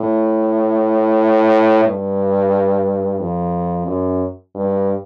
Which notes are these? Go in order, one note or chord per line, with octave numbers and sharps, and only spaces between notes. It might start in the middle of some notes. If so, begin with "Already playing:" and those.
Already playing: A2
G2
F2
F#2
G2